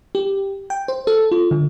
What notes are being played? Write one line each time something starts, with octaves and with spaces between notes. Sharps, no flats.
G4
G5
C5
A4
F4
D3